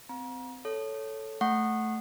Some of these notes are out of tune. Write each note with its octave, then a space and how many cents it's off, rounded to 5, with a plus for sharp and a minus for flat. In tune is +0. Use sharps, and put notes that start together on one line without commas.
C4 -30 A#5 +40
A4 +0 C#5 +0
A3 +0 F#5 +0 C#6 -20